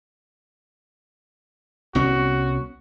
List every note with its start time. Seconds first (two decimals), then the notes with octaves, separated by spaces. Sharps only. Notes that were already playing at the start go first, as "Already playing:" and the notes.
1.95 C2 B3 C#4 F#4